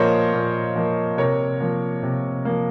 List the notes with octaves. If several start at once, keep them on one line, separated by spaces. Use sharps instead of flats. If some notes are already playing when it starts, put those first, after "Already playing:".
Already playing: A#2 F3 A#3 A#4 C5 C#5 D#5
A#2
F3 A#3
C3 A#4 C#5
F3 A#3
C3
F3 A#3